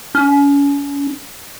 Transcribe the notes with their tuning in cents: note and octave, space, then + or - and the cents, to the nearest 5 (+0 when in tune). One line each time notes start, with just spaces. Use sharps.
C#4 +35